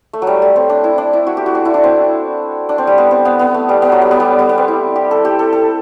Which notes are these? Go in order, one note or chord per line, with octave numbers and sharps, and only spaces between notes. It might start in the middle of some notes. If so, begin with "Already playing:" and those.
A3
F#3
G3
A3
C4
D4
E4
D4
E4
F#4
G4
F#4
D4
E4
D4
C4
D4
C4
G3
B3
C4
B3
B3
A3
G3
B3
F#3
G3
B3
G3
G3
B3
C4
E4
G4
A4
G4
A4
A4